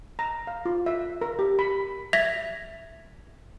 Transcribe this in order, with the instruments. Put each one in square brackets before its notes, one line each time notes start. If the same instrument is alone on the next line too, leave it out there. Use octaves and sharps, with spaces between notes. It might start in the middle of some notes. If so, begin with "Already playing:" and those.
[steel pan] A#5
F5
F4
E5
A#4
G4
B5
[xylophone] E5 G#6 A#6 B6 F7